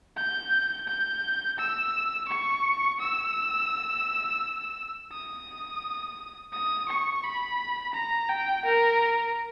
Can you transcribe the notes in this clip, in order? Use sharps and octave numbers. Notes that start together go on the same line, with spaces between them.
G6
G6
E6
C#6
E6
D#6
D#6
C#6
B5
A#5
G5
A#4